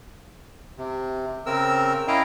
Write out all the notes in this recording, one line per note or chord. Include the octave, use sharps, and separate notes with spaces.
C3
C#3 C4 A#4 E6
C#4 E4 D#5 F5 G5 A#5